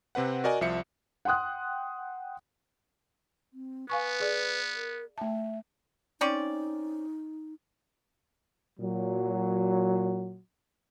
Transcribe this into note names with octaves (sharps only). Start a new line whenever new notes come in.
C3 C4 B4 F#5
F#4 A#4 D5 D#5 G#5
C2 F3 E5 C#7
F#5 G5 C6 D#6 F#6
C4
B3 B4 F5 G#5 C#6
G#4 D5
A#4
A3 E5 A5
C4 C#4 D#4 D5
A#2 F#3